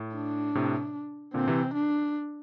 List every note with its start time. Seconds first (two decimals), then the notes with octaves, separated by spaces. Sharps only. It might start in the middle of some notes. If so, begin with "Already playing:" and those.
Already playing: A2
0.16 D4
0.55 A2 C3
1.34 A#2 D3 C4
1.47 C3 E3
1.74 D4